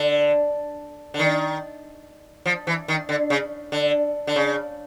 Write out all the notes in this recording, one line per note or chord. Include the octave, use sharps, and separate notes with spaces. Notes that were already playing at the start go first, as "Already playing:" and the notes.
Already playing: D3
D3
D#3
F3
E3
D#3
D3
C#3
D3
D3
C#3